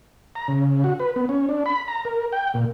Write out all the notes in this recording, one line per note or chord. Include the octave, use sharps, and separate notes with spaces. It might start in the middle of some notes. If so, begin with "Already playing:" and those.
A#5
C#3
F#4
B4
B3
C#4
D4
B5
A#5
A#4
G5
A#2